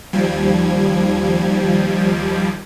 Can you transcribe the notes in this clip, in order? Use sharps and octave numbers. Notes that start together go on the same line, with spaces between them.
D#2 F3 G3 G#6